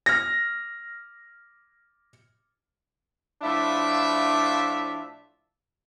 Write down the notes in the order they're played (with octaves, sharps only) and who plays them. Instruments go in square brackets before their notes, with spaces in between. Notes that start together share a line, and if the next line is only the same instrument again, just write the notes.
[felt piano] F6 A#6
[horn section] A2 F3 D4 E4 F4 E5